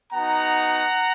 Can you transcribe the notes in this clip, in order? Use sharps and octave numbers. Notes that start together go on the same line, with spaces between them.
B3 D#4 F#4 F#5 A#5